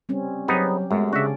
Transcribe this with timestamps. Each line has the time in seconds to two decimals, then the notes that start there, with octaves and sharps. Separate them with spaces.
0.09 G3 C4 C#4
0.48 F#3 B3 C4 D#4 G4 G#4
0.91 F#2 G#3 A3 B3
1.13 C#3 C#4 D4 F#4 D5 E5